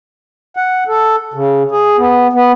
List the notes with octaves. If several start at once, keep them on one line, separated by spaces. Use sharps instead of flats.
F#5
A4
C#3
G#4
B3
B3